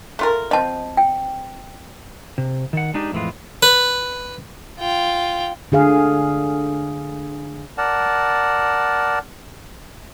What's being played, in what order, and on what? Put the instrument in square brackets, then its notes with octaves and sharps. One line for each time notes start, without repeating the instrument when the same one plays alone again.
[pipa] A3 F4 A#4
[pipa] F3 C4 [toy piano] D#5 A5
[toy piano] G5
[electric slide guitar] C3
D#3 F#5
G#3 D4 D#4 G4
F2 A2 E3 G#3 F4
[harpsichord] B4
[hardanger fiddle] F4 G5
[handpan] D3 G#4 F5
[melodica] A#4 D5 F#5 A5